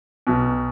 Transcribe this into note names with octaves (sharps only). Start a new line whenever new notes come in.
B1 B2